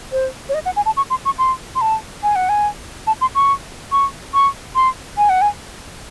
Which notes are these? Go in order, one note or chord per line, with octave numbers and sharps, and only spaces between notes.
C5
C#5
D#5
F#5
G#5
A5
C#6
C6
C#6
C6
C6
A5
G#5
F#5
G#5
A5
C6
C#6
C#6
C#6
C6
G#5
F#5
G#5